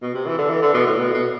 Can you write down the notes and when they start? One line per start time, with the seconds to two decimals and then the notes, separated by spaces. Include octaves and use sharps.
0.02 B2
0.15 C3
0.26 E3
0.38 D3
0.50 E3
0.62 D3
0.74 B2
0.87 A2
0.99 B2
1.14 B2